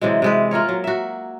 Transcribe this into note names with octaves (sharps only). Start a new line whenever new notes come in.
C3 E3 F#3 G#3
C3 G#3 B4
A#3 F4 A#4 C#5
F#3
F#4 E5